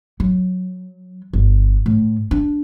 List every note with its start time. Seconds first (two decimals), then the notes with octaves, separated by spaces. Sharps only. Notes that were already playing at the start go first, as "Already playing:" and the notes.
0.20 F#3
1.33 G1
1.86 A2
2.31 D4